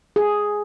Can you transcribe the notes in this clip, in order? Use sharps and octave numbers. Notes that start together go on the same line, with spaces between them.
G#4